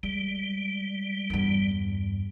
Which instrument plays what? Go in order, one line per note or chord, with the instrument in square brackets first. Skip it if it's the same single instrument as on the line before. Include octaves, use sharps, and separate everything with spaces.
[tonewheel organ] G3 [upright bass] G#3
[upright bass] E2 G2